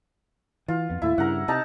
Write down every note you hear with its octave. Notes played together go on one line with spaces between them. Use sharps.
E3 F4
F2 B3
D#2 A2 A3 E4
G2 C#3 A#4 F#5
C3 D#4 A5 A#5